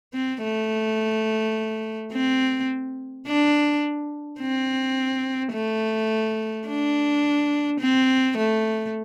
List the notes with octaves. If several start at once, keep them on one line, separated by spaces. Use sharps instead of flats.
C4
A3
C4
D4
C4
A3
D4
C4
A3